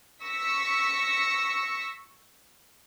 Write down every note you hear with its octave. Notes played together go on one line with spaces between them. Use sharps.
C#6 E6 A#6 B6